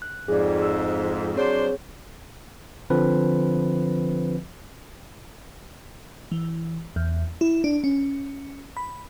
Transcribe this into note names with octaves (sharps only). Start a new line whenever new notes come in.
F#6
F2 G#2 G#4 D5
E6
F#3 C4 D4 G#4 C5 C#5
D3 F3 C4 B4
E3
E2
E4
D4
C#4
B5